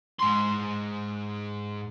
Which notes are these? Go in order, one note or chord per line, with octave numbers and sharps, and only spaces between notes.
G#2 C6